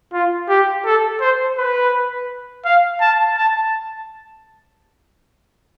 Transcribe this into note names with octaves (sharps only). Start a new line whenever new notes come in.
F4
G4
A4
C5
B4
F5
A5
A5